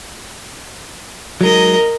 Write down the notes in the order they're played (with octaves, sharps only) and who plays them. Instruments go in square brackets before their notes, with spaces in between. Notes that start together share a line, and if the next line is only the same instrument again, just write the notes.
[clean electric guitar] F#3 G#3 D#4 [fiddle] A#4 D#5